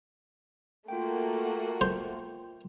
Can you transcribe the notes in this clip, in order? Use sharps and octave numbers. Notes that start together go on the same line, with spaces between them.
A3 A#3 F4 F#4 G5
C5